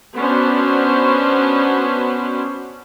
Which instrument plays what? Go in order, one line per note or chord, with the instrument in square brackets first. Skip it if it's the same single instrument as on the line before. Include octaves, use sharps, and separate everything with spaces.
[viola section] B3 C#4 D4 F#4 B4 C5